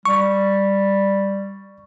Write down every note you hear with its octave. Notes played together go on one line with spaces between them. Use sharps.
G3 C#6